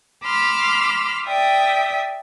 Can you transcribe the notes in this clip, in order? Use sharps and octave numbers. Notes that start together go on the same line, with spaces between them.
B5 C6 D6 E6 F6
D5 E5 G5 D#6